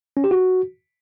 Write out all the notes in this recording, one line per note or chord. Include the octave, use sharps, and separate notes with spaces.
C#4
G4
F#4